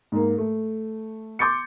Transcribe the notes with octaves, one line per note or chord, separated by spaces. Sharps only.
G#2 A#3
A3
C6 D6 G6 A6 C#7